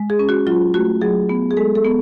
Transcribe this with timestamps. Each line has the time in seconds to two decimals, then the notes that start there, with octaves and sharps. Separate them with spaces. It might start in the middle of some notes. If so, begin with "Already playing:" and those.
Already playing: G#3
0.10 G#4
0.19 C#4
0.29 F#4
0.47 F#3 F4
0.74 A3 F#4
1.02 F#3 G#4
1.29 B3
1.51 G#4
1.57 G#3 A4
1.75 A4
1.85 B3